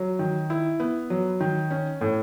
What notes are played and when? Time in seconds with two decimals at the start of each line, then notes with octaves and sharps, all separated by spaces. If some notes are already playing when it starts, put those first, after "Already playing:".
Already playing: F#3
0.19 D#3
0.50 E4
0.80 B3
1.10 F#3
1.40 D#3
1.71 C#4
2.01 A2